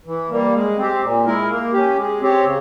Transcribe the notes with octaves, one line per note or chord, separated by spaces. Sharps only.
E3
G3 A#3
G#3
C4 G4
A#2
G#3 E4 A#4
A#3
C#4 G4
G#3
C4 G4 C#5
C#3